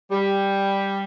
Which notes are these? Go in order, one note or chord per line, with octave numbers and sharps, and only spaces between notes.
G3